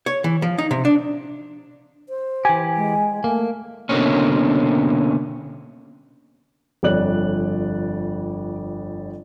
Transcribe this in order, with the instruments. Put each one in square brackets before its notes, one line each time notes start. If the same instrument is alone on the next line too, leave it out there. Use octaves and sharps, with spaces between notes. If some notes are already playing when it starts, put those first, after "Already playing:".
[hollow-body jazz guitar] C#5
E3
F3
D#4
C3
D4
[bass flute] C5
[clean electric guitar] E3 G4 [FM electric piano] G#5
[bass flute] G#3
[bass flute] A3 [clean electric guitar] A#3
[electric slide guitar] B2 D3 A#3 C4 C#4
[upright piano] G1 F2 C#5 D5 F#6 F#7